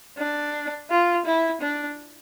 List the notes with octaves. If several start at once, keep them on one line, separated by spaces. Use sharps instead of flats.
D4
F4
E4
D4